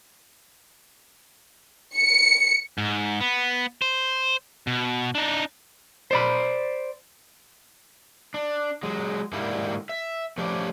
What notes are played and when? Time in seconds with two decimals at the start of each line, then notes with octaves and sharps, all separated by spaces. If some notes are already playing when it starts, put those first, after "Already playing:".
1.96 C#7
2.78 G#2
3.20 B3
3.82 C5
4.67 B2
5.15 D4 D#4
6.11 C5 D5 B5
8.34 D4
8.83 F#3 G#3
9.33 G#2 D3 G3 A#3 E4
9.89 E5
10.38 F3 A3 C#4 G4 D5